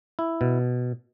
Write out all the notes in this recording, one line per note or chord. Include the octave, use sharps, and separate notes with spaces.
E4
B2